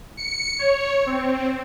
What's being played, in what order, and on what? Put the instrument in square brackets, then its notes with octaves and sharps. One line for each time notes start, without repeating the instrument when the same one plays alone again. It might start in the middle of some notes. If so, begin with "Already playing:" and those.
[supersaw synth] C#7
C#5
C4